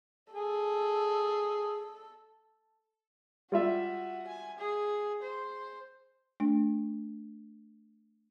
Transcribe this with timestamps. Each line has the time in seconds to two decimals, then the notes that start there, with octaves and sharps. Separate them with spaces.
0.32 G#4 A4
3.52 G3 F4 F#4 E5
4.27 G#5
4.59 G#4
5.22 C5
6.40 A3 D4